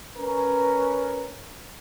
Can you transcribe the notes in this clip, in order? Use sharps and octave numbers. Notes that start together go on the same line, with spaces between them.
C#4 A#4 B4